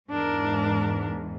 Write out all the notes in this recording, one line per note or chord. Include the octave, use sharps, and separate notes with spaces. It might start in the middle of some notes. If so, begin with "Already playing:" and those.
E2 G#2 D4 A#4